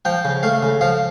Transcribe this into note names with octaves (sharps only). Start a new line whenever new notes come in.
F3 G5
C#3
A3 F5
C#3
F3 F5